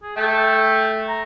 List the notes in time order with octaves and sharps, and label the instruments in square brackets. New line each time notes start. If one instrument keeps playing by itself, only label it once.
[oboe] G#4
[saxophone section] A3 [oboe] G5
[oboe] A#5